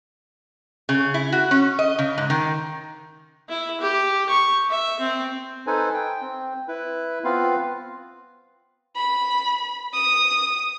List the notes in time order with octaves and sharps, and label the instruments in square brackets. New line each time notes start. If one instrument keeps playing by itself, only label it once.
[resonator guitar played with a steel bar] C#3
E4
F#4
C#4
D#5
C#3
G#2
D#3
[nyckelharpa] E4
G4
C#6
E5
C4
[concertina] D#4 A4 B4 C5 G#5
G5
C4
E4 B4
B3 C4 F4 B4 F5
[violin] B5
D#6